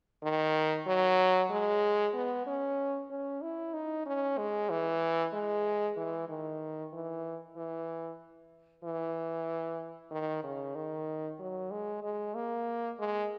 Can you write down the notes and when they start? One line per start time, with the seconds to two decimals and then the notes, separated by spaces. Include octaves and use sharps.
0.23 D#3
0.87 F#3
1.50 G#3
2.14 B3
2.46 C#4
3.10 C#4
3.42 E4
3.73 D#4
4.06 C#4
4.38 G#3
4.70 E3
5.33 G#3
5.97 E3
6.29 D#3
6.93 E3
7.56 E3
8.84 E3
10.11 D#3
10.43 C#3
10.75 D#3
11.39 F#3
11.71 G#3
12.03 G#3
12.35 A#3
12.99 G#3